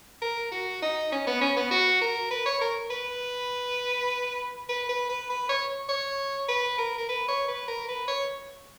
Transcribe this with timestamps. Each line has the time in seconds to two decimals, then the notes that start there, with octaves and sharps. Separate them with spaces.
0.22 A#4
0.51 F#4
0.82 D#4
1.12 C#4
1.27 B3
1.41 C#4
1.56 B3
1.71 F#4
2.01 A#4
2.31 B4
2.46 C#5
2.61 A#4
2.90 B4
4.69 B4
4.89 B4
5.09 B4
5.30 B4
5.49 C#5
5.89 C#5
6.48 B4
6.78 A#4
6.98 A#4
7.09 B4
7.28 C#5
7.48 B4
7.68 A#4
7.88 B4
8.08 C#5